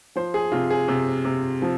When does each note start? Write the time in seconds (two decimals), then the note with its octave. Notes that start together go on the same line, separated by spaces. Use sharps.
0.16 F3 C5
0.34 G#4
0.52 C3 F4
0.70 G#4
0.88 C3
1.25 C3
1.62 F3